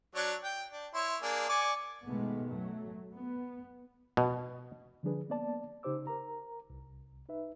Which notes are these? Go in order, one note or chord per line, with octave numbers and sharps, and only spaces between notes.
F#3 D4 C#5
G5
D4
E4 C#5 C6
A#3 D4 G#4
D5 G#5 C#6
B2 D#3 G#3 A3 B3
F#3 A3
B3
B2
D3 F3 G3 D4 G#4 B4
A#3 B3 D5 A5
C#3 D#4 G4 C5 D6 E6
A#4 A#5
C2
D#4 B4 E5